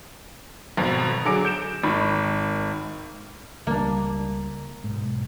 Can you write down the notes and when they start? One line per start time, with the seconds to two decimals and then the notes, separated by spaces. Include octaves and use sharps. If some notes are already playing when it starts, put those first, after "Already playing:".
0.77 G#1 F2 B2
1.25 D3 F#3 G#4 D6 D7
1.45 G6 D7 E7
1.83 G#1 D#3 B5
3.67 C#2 G3 A#3 D4
4.84 B1 G#2